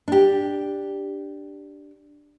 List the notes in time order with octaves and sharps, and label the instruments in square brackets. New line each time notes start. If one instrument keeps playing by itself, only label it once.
[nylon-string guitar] D4 G4